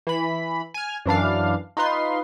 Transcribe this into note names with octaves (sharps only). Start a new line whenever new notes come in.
E3 B5
G#5 F6
F#2 E3 D4 F5
D#4 F4 B4 C6